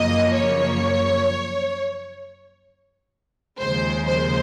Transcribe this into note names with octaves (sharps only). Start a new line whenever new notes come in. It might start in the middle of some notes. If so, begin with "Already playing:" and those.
Already playing: F#2 C#3 F3 A#3 D#5
C#5
D#2 C#3 F3 G#3 C5
C5